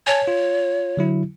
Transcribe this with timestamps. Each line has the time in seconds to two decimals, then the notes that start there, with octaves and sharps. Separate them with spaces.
0.07 C#5 G#5 A5
0.28 F4
0.97 D3 F#3 E4